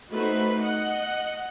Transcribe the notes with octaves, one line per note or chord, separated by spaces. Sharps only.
A3 B3 D#4 F#4 B4 C5
D#5 F#5